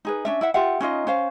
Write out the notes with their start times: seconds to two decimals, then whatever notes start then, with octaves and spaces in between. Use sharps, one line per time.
0.05 D#4 G#4 B4
0.25 C#4 D4 E5
0.41 E4 E5 F#5
0.54 F4 G4 E5 F#5
0.81 C#4 D#4 F4 D#5
1.07 C#4 C5 F5